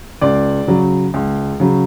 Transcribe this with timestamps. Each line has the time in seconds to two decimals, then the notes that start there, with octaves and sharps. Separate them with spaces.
0.21 C#2 D5
0.67 C#3 F#3
1.14 C#2
1.60 C#3 F#3